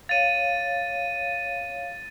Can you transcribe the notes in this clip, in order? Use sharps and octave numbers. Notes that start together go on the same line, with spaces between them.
C#5 F5 A6 D#7